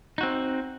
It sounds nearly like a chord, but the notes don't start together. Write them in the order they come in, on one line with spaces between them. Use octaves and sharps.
D#4 F#4 C4